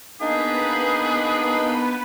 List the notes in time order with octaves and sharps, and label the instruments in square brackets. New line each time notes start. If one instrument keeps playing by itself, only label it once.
[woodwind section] A#3 D4 D#4 [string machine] B3 B4 B5 [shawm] G#4 [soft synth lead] D#5